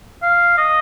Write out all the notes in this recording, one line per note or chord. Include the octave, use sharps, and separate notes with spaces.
F5
D#5